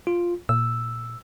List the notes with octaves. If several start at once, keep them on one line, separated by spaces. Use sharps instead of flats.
F4
A#2 E6